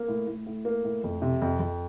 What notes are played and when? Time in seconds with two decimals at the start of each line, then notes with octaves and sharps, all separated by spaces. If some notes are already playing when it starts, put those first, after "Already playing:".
Already playing: A#3
0.08 A2
0.27 A2
0.46 A2
0.65 A#3
0.85 A2
1.04 F2
1.22 C3
1.42 F2
1.60 F2